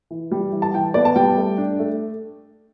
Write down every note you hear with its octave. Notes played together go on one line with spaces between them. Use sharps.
E3
G3
E3
A5
E3 G5
B3 D5
A5
G3 G5
A3
D4
A3